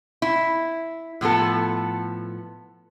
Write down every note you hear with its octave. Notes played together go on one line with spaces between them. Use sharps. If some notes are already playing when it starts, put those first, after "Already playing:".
E4
A2 F3 B3 A4